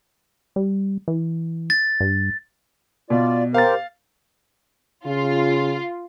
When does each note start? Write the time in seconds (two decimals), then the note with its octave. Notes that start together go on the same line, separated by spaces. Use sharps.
0.56 G3
1.08 E3
1.70 A6
2.01 G2
3.10 B2 F4 D5
3.54 G4 A#4 C5 F5 A6
5.07 C#3 F4